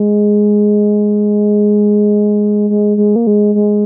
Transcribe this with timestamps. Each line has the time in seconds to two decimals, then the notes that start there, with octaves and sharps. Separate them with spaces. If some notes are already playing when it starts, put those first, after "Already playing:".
Already playing: G#3
2.70 G#3
2.97 G#3
3.16 A#3
3.27 G#3
3.55 G#3